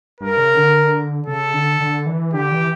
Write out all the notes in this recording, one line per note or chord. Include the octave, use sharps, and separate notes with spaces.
G2 A#4
C#3
D3
C#3 A4
D3
D3
E3
D3 G4
E3